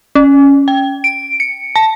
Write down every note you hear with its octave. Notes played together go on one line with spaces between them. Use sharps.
C#4
G5
D7
C#7
A5